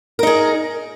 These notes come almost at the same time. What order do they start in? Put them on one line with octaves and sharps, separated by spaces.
A#4 D#4 G#4